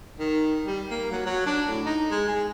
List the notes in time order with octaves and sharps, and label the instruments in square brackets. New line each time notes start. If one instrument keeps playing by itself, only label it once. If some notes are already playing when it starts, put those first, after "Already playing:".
[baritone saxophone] D#3
G3
A#3
F#3
F#3
D4
A2
D#4
G#3
G#4